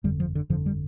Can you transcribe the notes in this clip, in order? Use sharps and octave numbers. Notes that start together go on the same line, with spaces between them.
G1 F2 D3 G3
F3
D3
G1 F2 D3 F3
G3